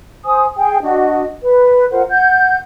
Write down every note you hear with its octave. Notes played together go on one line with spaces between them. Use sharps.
C5 G#5 D#6
G#4 G5
D4 F#4 D#5
B4
F4 A#4 C5 F#5
F#5 G6